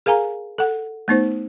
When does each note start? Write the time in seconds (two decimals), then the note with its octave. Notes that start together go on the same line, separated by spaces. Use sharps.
0.06 G#4 A#4 F5 G#5 A#5
0.58 A4 F#5
1.08 A3 B3 D#4 C5